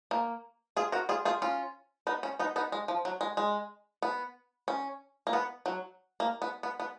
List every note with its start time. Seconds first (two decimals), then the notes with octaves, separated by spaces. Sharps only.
0.11 A#3
0.77 F4 G#4
0.92 F#4 A#4
1.09 F4 G#4
1.25 F4 G#4
1.42 C#4 F4
2.07 B3 D#4
2.23 C#4
2.39 B3 D#4
2.56 B3 D#4
2.72 G#3
2.88 F3
3.05 F#3
3.21 G#3
3.37 G#3
4.02 B3
4.68 C#4
5.27 A#3
5.33 B3
5.66 F#3
6.20 A#3
6.42 B3
6.63 B3
6.80 B3